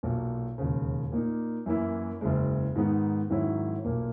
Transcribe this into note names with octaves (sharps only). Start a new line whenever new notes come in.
B1 A#2 F#3
E1 D#2 C#3
A#2 A#3 D#4
F#2 E3 A#3 E4
F#1 E2 C#3 G#3
G#2 D#3 G#3 B3 D#4
G#2 D#3 F#3 C#4 E4
B1 A#2 A#3